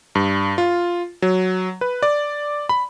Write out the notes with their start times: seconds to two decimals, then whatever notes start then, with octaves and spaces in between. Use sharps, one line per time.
0.15 G2
0.58 F4
1.22 F#3
1.81 B4
2.03 D5
2.69 B5